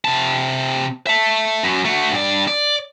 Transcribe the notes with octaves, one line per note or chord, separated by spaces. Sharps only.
C3 A5
E5 A5
F#2 F#3
A3 F#4
G2 D5
D5